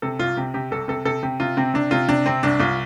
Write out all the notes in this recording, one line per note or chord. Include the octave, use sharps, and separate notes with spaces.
C3 A4
C2 F4
C3 G4
C3 G4
C2 A4
C3 A4
C3 A4
C3 G4
C3 F4
C3 C4
C3 D4
C3 F4
C3 D4
C3 C4
C2 D4
C2 F4